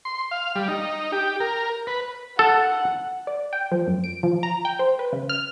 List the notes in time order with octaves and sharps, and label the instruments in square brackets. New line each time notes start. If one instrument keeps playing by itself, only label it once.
[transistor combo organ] C6
F5
G3
D#4
G4
A#4
B4
[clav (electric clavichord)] A4 [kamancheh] F#5
[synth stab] D5
G5
F3
F#2
D7
F3
A#5
G5
C5
B4
C#3
F6